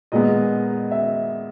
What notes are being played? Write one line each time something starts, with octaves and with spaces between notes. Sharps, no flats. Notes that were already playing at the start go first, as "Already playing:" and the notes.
A#2 G#3 B3 D#5
E5